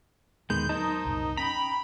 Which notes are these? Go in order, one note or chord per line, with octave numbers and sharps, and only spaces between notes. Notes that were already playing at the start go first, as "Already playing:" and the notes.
D#2 A#2 D3 D#3 G#3 B3 G6
F#3 D#4 A#4 C5 A5
C2 F#2 A#2
C#4 G5 A#5 B5